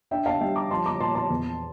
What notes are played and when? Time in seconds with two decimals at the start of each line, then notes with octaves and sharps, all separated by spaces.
0.11 D4 E5 G5
0.26 F5 A5
0.41 G3 E5 G5
0.56 A#5 D6
0.71 F3 A5 C6
0.86 A#5 D6
1.00 A#2 A5 C6
1.15 A5 C6
1.30 E2